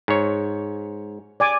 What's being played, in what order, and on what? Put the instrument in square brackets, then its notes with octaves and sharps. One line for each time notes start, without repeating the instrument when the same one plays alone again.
[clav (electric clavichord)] G#2 C#5
[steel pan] D5 G#5 D6